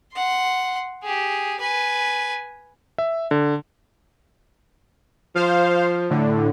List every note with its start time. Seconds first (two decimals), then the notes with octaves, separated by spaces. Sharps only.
0.14 F#5 C6
1.03 G4 G#4
1.60 B4 G#5
2.98 E5
3.31 D3
5.35 F3 C5 F5
6.10 A2 D3